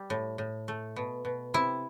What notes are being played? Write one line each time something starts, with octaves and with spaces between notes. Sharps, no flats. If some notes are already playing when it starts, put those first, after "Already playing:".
Already playing: G3
A2
A2
A3
B2
B2
C3 E4